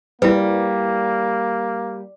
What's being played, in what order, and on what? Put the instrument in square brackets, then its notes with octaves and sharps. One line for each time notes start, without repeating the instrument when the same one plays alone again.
[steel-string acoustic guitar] G3 [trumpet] A#3 [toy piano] E4 B4